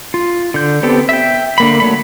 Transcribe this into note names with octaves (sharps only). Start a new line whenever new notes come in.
F4
D3 G6
B3 C4 G4 A4
E5 G5
D3 A#3 B5
F#3 A3 B5